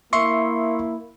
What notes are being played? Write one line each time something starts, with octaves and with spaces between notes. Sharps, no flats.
A#3 E4 E5 C6 C#6